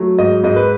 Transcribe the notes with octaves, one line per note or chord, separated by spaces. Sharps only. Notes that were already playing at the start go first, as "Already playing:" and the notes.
Already playing: F#3 A3
G#2 D#5
G#2 D#5
B4